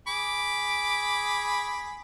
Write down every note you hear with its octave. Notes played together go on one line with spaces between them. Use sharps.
G#4 B5 D6